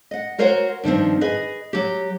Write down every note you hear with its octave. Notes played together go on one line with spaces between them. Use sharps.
D#5 F#5
F#4 A#4 C5 C#5 F#5
G2 D#3 F3 C4
G#4 B4 D#5 G#5
F#3 G4